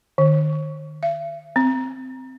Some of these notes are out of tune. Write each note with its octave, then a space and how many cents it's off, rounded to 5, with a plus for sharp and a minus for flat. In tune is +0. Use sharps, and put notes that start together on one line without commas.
D#3 -30
E5 +45
C4 -10